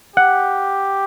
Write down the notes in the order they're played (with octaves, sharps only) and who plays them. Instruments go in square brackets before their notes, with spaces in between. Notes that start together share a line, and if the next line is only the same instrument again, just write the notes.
[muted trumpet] G4 [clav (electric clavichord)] F#5